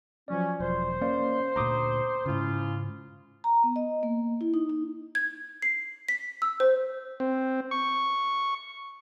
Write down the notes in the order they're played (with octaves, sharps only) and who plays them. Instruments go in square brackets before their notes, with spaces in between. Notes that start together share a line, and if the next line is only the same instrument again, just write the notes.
[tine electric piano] F3 F#3 D5 [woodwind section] C#4
[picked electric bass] E1 [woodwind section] C5
[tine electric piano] A#3 D5 F5 [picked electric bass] C#4
[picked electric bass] D2 A#2 [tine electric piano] A#5 D6 D#6
[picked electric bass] G#2 C#3 [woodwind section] C#4 E4 F4
[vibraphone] A#5
B3
D#5
A#3
E4
D#4
D#4
[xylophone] G#6
C7
B6
E6
C5
[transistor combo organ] C4
C#6